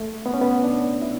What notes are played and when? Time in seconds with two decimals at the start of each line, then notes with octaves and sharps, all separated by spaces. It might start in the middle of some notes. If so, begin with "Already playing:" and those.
Already playing: A3
0.26 B3
0.34 C#4
0.42 B3
0.64 D4
1.02 E4